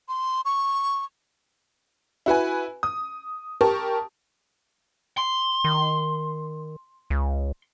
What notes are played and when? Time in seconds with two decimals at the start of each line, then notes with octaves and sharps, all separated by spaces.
0.08 C6
0.45 C#6
2.26 E4 F#4 B4 G#5
2.83 D#6
3.61 G4 A#4 A5 C#6
5.18 C6
5.64 D#3
7.10 C#2